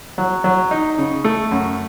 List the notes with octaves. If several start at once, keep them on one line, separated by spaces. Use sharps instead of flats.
F#3
F#3
D#4
C#3
A3
F#2